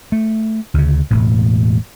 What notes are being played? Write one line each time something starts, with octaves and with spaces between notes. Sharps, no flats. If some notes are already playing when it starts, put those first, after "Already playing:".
A3
D2 C#3
E1 A2